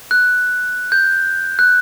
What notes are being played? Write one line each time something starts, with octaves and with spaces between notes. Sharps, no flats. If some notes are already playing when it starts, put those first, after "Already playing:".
F#6
G6
F#6